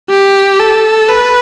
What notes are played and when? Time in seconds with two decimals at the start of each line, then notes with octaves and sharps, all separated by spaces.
0.10 G4
0.60 A4
1.09 B4